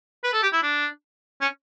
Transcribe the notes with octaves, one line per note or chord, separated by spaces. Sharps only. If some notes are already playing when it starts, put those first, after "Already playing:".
B4
A4
G4
E4
D4
C#4